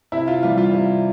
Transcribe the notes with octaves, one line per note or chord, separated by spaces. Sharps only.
C3 E4
F4
E3 G3 F4
F4
C3